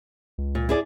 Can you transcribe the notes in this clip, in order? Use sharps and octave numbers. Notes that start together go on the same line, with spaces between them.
C#2
A#2
E4 G#4 D5